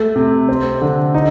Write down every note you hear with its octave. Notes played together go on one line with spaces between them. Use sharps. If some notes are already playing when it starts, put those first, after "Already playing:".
Already playing: A3
C3
C4
D3
D#4